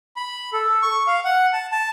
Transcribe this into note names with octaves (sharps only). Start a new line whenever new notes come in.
B5
A4
C#6
F5
F#5
A5
A5